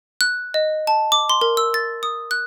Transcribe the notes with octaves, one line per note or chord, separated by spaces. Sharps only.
F#6
D#5
A5
D6
C6
A#4
E6
A6
D#6
F#6